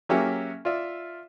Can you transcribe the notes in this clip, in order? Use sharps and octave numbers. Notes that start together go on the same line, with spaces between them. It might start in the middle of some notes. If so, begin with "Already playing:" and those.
F#3 A#3 C#4 G4 G#4 E5
F4 D5 E5